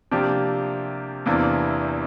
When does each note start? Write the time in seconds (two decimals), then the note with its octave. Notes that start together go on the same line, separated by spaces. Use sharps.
0.11 C3 F3 A#3 D4 G4
1.26 E2 C3 E3 A#3 D4